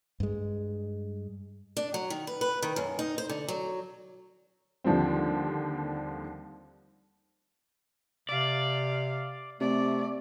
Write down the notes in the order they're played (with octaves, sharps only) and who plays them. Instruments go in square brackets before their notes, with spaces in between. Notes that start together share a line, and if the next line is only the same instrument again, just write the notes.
[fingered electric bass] G2 G#3
[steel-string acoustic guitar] D4
F#3
D#3
B4
B4
D#3
F#2
D#4
C5
D3
F#3
[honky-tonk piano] D#2 D3 F3 G3 C4
[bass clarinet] C3 [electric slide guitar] D5 [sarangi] F5
[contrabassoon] C3 [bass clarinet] A3 [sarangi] D5